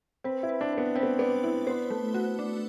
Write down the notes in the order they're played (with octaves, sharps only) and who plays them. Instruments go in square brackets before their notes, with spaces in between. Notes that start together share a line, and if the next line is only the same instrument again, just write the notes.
[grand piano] C4 [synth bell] B4
[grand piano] E4
[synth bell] B4
[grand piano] D4
[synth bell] B4
[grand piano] B3
[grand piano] C4 [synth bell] B4
[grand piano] B3
[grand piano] B3 [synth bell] D5
[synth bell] E4
[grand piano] B3 [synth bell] C5
[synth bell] A3
F#4
D4